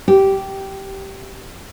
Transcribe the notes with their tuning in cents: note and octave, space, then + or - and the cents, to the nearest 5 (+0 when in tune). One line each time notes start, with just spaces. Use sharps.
G4 -10